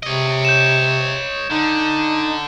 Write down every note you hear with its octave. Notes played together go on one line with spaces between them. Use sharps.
C3 C#5 D#5
G6 E7
D3 D#4